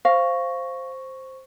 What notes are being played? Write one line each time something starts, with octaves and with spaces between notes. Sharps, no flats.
C5 F5 C#6 A#6